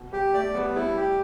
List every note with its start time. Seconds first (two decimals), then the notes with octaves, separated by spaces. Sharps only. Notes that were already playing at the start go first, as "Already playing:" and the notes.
Already playing: B2
0.13 G3 G4
0.34 A3 D5
0.55 G3 B3
0.76 G3 E4
0.97 G4